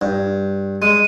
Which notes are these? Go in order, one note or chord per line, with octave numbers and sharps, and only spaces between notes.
G2
G#3 D#7